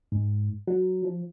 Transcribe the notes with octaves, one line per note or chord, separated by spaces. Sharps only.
G#2
F#3
F3